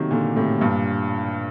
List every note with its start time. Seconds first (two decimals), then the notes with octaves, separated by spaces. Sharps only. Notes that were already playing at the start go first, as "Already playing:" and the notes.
Already playing: C3 D#3 F#3 A3 A#3
0.11 A#2 D3
0.36 A2 C3
0.61 G2 A#2